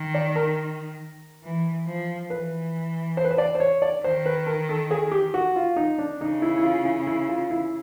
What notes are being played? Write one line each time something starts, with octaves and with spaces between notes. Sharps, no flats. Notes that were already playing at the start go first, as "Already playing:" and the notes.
Already playing: D#3
D5
A#4
E3
F3
E3 B4
C5
B4
C5
D5
C5
C#5
D5
D#3 C5
B4
A#4
A4
G#4
G4
F#4
F4
D#4
D4
C#3 D#4
E4
E4
F4
E4
E4
F4
E4